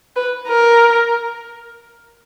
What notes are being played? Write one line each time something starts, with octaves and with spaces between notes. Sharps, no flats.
B4
A#4